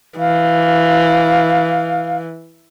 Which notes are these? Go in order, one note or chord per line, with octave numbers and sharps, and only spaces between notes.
E3 F5